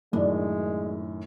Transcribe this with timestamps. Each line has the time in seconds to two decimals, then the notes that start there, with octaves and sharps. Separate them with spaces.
0.13 F#2 A2 D#3 G#3 D4